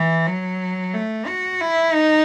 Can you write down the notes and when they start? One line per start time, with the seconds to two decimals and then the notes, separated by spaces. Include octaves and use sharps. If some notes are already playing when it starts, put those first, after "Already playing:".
Already playing: E3
0.26 F#3
0.94 A3
1.27 F#4
1.61 E4
1.94 D#4